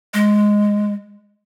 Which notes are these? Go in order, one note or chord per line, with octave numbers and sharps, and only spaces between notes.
G#3